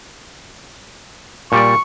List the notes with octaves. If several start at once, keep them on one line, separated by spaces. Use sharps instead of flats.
A#2 G3 D5 C#6